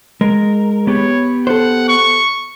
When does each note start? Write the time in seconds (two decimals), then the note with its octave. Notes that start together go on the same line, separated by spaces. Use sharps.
0.21 G#3 A#4
0.87 B3 G4 B4 C#5
1.47 A4 C5 F#5
1.89 C#6